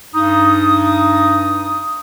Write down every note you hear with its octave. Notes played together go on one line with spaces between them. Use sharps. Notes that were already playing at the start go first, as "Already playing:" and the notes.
G2 D#4 D#6